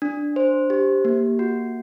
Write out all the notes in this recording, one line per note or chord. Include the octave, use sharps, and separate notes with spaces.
D4
C5
G4
A#3
F#4